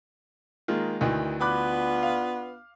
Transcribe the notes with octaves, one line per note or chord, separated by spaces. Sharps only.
D#3 G#3 A#3 F4
D2 D#3 E3 D#5
B3 D4 F4 B5 D6 F#6
F5